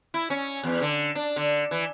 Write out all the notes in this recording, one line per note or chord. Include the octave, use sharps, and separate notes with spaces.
E4
C#4
E2
D3
D4
D3
E3